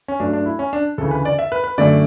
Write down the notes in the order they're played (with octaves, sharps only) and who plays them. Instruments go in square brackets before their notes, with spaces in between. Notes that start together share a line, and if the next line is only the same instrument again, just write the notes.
[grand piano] C#4
G2 F#3 A3 D4
D4
E4
C#4
D4
D2 C#3 E3 A4
B4
D5
E5
B4
B4
F#2 D3 A3 D5